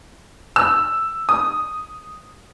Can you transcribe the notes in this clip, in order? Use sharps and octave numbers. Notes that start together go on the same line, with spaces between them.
E6
D#6